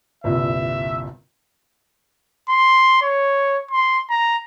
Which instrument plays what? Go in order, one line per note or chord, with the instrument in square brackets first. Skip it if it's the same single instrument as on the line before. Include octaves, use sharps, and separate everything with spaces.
[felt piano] G1 C2 A#2 [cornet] E5
[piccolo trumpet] C6
C#5
C6
A#5